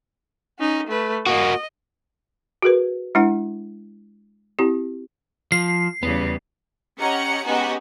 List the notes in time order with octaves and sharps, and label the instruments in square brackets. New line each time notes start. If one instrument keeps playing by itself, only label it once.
[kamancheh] C#4 D#4
A3 B4
[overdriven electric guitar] A#3 F#4 [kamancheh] D#5
[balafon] F#4 G#4 A#4 B4
G#3 D4 E4 F#5
C4 E4 G4
[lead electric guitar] F3 [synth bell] C7
[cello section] E2 C#3 G3 [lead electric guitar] B3
[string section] C#4 G4 D#5 F#5 A#5 C#7
G#3 B3 C#4 D#4 F#4 G4